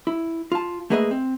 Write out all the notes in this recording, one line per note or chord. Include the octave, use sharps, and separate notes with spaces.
E4
F4 A5
A3 A#3 G#4 B4 D#5 E5
C4